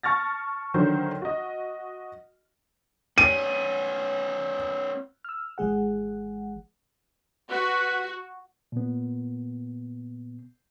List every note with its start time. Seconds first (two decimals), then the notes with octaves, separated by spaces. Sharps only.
0.03 A5 C#6 F6 A6 A#6
0.74 D3 D#3 F#3 C5
1.22 F#4 D#5
3.18 B3 C#4 D#7
5.24 E6 F6
5.58 G#1 E3 G#3 G#4 F#5
7.51 F#4 B4
8.72 A#2 B3